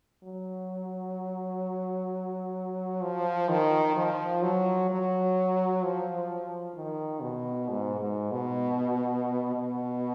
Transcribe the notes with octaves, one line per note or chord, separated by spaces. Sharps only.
F#3
F3
D#3
F3
F#3
F#3
F3
D#3
B2
G#2
G#2
B2
B2